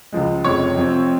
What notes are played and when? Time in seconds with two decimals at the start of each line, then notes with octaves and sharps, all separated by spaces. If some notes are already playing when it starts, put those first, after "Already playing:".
0.12 C#2 C#3 F3 G#3
0.44 F1 F2 C3 F3 G#3 C#5 C#6
0.76 F2 C3 F3 C4